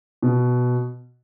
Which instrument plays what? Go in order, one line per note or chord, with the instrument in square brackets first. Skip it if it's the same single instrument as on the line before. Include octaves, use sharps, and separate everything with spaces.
[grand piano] B2